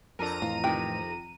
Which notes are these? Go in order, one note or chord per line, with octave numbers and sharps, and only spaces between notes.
F2 D4 A4 A#4 A#5 D#7
A2 E3 F4
C3 D#3 G5